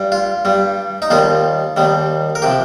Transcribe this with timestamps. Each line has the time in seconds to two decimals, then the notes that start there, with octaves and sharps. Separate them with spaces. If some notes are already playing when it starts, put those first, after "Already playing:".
Already playing: G2 G3
0.12 F4
0.45 G2 G3
1.02 D#4
1.10 D#2 D#3 G3 F4
1.77 D#2 D#3 G3
2.35 A#4
2.42 C3 F3 G4